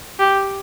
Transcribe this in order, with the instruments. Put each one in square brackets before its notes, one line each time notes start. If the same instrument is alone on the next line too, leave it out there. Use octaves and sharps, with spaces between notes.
[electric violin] G4